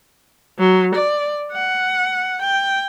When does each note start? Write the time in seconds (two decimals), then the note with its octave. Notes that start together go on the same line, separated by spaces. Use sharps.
0.59 F#3
0.95 D5
1.52 F#5
2.42 G5